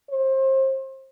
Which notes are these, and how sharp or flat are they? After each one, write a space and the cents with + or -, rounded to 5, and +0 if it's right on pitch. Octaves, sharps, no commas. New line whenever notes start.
C5 +30